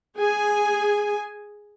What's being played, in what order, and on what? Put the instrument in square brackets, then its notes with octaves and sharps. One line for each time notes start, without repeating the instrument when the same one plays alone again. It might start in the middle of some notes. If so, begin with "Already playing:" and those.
[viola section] G#4 G#5